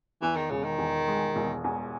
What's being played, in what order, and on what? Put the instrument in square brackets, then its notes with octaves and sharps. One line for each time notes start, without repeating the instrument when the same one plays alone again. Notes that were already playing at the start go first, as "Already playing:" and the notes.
[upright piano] E2 [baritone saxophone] E3
[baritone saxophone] D#3
[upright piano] E1 [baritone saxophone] C#3
[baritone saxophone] D#3
[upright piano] E2
G#3
E1
E2